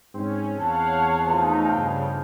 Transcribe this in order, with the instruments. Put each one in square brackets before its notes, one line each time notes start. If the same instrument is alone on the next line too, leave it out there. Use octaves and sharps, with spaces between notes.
[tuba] G#2 [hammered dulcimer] C4 [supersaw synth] C#4
[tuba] E2 [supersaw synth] C#5 F5 F#5 [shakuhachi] A5
[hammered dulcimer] F3 B3 [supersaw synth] A3 D#4
[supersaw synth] G2 C#3 [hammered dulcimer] F5 G5